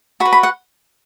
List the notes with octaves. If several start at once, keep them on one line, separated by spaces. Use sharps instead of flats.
F#4 B5
B4
B5
F#5